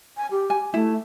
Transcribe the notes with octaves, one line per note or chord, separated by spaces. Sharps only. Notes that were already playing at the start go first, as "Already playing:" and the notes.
G#5
G4
G#5
A3 E4